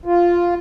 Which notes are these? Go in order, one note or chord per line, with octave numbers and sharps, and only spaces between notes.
F4